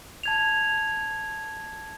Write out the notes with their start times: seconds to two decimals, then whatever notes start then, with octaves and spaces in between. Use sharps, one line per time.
0.23 A5 G#6 F7